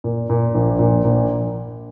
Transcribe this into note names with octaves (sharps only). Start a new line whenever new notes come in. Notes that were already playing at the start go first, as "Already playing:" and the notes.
A#2
A#2
A#1
A#2
A#1